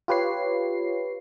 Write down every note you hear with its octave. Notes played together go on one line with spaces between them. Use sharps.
F4 G4 B4 C#5 C7